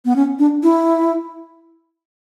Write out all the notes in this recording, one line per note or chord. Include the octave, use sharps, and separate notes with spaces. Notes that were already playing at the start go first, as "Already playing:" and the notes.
B3
C#4
D4
E4